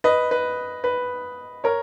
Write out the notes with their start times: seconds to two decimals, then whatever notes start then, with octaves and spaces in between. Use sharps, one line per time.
0.04 B4 D#5
0.31 B4
0.84 B4
1.64 A#4 C#5